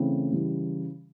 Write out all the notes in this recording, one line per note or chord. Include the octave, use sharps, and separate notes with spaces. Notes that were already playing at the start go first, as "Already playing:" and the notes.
Already playing: C#3 E3 A3 C4
C#3 E3 G3